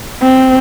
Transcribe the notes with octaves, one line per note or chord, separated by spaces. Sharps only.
C4